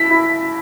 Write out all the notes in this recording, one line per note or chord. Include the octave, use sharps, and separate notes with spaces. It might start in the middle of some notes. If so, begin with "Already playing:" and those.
Already playing: E4 B6
E4